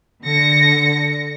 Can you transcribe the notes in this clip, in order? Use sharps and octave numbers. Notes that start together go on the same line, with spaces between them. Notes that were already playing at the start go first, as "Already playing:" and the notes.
D3 A#6 C#7